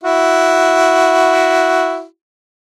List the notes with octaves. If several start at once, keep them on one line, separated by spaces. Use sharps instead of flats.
E4 F#4